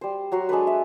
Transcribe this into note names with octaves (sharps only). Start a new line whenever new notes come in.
G3 C5
F#3 F#4 A#5 C6
G#3 D4 A4 B4
E5